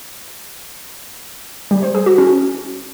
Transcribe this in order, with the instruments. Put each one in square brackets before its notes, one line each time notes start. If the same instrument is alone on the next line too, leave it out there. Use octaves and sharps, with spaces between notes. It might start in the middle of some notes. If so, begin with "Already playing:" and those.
[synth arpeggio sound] G3
C5
G#4
F#4
C#4